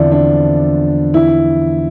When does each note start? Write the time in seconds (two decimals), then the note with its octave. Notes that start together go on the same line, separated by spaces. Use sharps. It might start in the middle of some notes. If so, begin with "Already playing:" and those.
Already playing: E2 D3 F3 C4 D4 E4
0.12 D4
1.14 E4